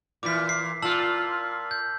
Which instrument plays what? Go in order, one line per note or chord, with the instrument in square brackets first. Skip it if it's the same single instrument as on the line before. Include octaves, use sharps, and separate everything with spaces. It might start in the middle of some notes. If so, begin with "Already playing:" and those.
[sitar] A#2 E3 [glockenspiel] D6 B6
[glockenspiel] C7
[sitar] A#2 F4 [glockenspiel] A5 E6 F#7
[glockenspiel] G6